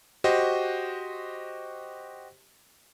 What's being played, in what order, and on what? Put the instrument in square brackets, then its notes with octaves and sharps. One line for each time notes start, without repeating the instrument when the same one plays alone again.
[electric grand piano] F#4 G4 C5 D#5